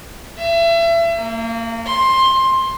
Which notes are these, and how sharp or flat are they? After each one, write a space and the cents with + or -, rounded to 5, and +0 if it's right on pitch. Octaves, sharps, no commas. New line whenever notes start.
E5 +30
A#3 -30
C6 +15